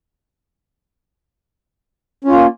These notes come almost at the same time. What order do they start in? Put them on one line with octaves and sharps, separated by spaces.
C#4 F4 A#3